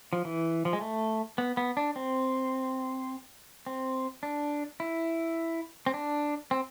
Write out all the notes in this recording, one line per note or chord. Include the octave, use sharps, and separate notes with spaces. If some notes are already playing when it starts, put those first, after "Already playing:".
F3
E3
F3
G#3
A3
B3
B3
D4
C4
C4
D4
E4
C4
D4
C4